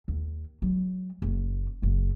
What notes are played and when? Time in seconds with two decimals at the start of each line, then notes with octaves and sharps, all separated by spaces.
0.08 D#2
0.62 F#3 G#3
1.22 F#1 A#3
1.82 F#1 C#3